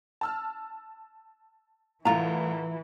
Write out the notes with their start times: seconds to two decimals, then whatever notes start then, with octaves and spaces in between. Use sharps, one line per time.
0.21 A5 E6 F6
2.05 C2 A2 E3 F4 A#5